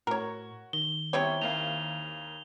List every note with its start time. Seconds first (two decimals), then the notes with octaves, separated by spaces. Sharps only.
0.07 A2 F#4 A#4 C#5
0.73 D#3 G7
1.13 C3 G3 B3 E4 G#4 C#5
1.41 D#2 A#3 F5 F7